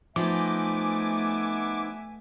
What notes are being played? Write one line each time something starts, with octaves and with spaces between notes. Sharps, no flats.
F3 A3 B3 D#4 E5 G#5 D6